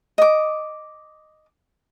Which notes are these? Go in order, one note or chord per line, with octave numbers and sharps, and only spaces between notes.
D#5 D6